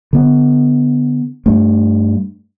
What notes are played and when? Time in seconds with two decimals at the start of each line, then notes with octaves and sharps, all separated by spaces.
0.13 D3 B3
1.46 G2 A3